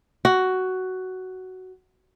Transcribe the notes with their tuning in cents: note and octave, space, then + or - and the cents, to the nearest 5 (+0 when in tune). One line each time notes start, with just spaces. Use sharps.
F#4 +10